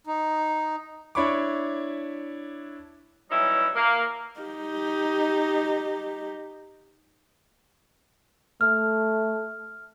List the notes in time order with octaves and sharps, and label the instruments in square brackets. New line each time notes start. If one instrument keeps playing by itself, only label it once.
[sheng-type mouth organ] D#4
[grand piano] D4 E4 C#5 B5 C#6 D6
[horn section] E3 F#3 G3 C#4 D#4 E4
A#3
[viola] D#4 G4
[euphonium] A3 [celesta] F6